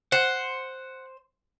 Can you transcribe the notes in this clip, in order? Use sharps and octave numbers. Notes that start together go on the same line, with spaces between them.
C5 F#5